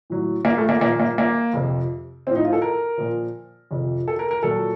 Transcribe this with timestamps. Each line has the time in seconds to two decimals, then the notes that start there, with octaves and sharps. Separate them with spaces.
0.10 A2 F#3
0.45 A#3
0.58 A3
0.69 A#3
0.81 A#2 A#3
0.84 F3
1.00 A#3
1.18 A#3
1.53 F2 C3 F3
2.27 F3 C4
2.30 A2
2.36 D#4
2.44 F4
2.53 A4
2.62 A#4
2.98 A#2 F3
3.71 F2 C3 F3
4.08 A4
4.19 A#4
4.31 A#4
4.43 A#2 F#3 A4